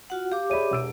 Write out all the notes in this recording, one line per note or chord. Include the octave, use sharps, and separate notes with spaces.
F4 F#4 F#5
G4 F5 D6
G#4 C#5 D5 E5 B5 D#7
E1 E6 D7